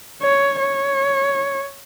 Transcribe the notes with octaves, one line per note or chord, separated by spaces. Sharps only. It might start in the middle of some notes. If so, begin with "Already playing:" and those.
C#5
C#5